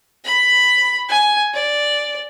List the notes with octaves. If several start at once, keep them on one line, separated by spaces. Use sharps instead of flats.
B5
G#5
D5